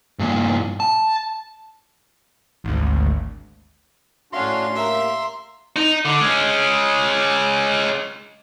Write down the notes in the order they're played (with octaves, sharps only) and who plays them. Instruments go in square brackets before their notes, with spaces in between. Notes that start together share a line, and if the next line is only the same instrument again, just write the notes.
[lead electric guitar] G2 A#2
A5
[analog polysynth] G#1 D2
[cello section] A2 F5 [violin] C#4 [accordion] D4 F#4 [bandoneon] C6
[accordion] A#3 [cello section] G4 [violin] E5 A#5
[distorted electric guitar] D#4
D3
G#3 C#4